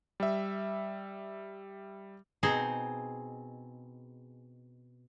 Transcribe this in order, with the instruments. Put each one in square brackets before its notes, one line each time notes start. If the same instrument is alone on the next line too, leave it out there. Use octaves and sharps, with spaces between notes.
[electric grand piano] G3 E5
[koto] B2 C4 D#4 G#4 C5